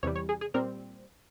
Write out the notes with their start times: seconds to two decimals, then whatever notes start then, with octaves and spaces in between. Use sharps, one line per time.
0.03 E2 C3 E3 G3 C#5
0.16 C#5
0.29 G#4
0.41 G#4
0.54 A#2 G3 C4 A#4